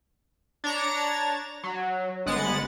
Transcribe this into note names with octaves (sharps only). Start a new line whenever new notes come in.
D4 C#5 A#5 A6
F#3
G1 G#3 B3 F#5 A6